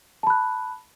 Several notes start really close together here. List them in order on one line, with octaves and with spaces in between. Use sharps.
A5 B5 F#6